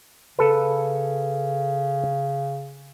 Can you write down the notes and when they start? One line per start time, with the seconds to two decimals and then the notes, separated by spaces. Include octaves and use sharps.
0.39 C#3 A4 B4